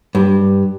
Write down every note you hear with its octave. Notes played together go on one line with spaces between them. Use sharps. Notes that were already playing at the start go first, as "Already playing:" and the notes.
G2